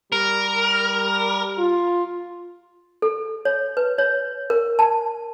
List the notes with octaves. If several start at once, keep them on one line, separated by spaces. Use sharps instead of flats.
G3 A#4
F4
A4
C#5
B4
C#5
A#4
A5